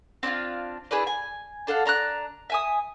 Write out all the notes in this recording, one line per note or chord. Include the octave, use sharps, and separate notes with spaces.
C4 D4 E4 F4
E4 G#4 B4 D5
G#5
D4 A4 F5 F#5
D4 A#5 C6 F#6
E5 G#5 D#6